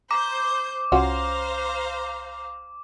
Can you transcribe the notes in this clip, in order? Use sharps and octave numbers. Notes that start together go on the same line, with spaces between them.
C5 A#5 D6 G6
C2 C#4 F4 F#4 C5 F5 A#5